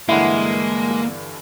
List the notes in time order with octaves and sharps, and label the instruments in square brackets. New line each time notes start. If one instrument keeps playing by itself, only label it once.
[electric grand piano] G2 D3 E3 [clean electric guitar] G#3 [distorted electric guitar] A#3 [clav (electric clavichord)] E4 F#5